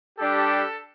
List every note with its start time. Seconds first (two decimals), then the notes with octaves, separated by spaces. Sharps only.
0.19 G3 D4 G4 A4